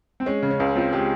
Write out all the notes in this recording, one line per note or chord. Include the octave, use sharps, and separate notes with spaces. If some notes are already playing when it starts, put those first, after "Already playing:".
C4
G#3 C#4
C#3
C#4
C#2
C4 F4
G#3 G4